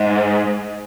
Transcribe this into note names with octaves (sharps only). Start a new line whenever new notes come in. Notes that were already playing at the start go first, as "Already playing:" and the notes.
Already playing: G#2